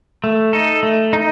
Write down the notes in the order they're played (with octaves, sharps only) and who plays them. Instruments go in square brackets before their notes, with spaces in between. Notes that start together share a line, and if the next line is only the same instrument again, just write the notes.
[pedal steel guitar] A3
D#4 A4
A3
D#4